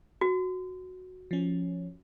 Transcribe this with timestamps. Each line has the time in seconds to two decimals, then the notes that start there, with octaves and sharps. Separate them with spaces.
0.21 F#4
1.31 F3 C#4